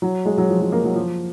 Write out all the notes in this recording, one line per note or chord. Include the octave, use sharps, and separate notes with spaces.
F#3
G#3
F#3
F3
F#3
A#3
F#3
F3